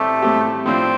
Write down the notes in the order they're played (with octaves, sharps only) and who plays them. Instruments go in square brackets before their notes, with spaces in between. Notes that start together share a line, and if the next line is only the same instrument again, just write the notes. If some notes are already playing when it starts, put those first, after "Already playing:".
Already playing: [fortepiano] A2 G3 C4 G4 [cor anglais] A3
[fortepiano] A2 G3 C4 G4
[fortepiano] A2 F3 D4 [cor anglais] C4